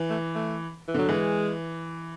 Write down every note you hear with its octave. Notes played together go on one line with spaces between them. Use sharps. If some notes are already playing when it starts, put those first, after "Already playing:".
Already playing: E3
A3
A3
E3
D3 F#3
E3 G#3